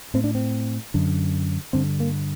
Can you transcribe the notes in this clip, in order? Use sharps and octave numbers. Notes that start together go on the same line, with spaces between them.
A2 C4
D4
C4
F#2 D3
G2 D3 C4
A#3